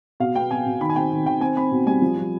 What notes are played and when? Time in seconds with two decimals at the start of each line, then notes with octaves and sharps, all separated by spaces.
0.20 B2 F5
0.35 B3 G5
0.51 B2 G#5
0.66 B2
0.81 D#3 B5
0.89 G#5
0.96 C4 G5
1.11 D#3
1.26 D#3 G5
1.41 C4 G#5
1.56 C4 B5
1.71 B2
1.86 G3 G#5
2.02 F3
2.17 F3